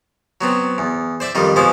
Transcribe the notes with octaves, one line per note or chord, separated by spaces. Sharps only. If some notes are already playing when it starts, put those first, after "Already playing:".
F#3 B3 C4
E2
C5 D5 E5
F2 D#3 G3 D#5
B2 F3 G#3 B3 C5 D6